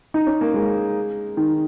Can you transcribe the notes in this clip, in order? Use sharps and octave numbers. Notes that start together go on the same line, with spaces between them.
D#4
C#4
A#3
G#3
D#3